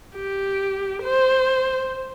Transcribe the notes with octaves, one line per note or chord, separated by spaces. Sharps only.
G4
C5